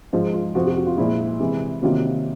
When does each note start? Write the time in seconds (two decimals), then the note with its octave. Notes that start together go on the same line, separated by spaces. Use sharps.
0.13 G#2 F3 G#3 F4
0.33 F4
0.55 F2 C3 F3 F#4
0.66 G4
0.77 F#4
0.87 F4
0.98 A#2 F3 G#3 E4
1.40 C3 E3 G#3
1.82 C3 D#3 F#3 A#3 F4